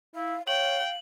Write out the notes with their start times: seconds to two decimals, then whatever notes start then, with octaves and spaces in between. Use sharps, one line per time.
0.15 E4 F5
0.47 C#5 F5 G5 F#7